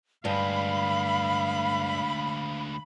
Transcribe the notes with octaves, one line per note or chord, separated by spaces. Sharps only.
D2 G2 G#3 F5 B5